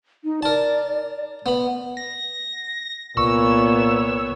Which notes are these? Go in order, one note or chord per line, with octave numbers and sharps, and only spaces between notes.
D#4
A#4 D5 A5
B3 B5
A#6
C2 A#2 B3 C#5 C#6 E6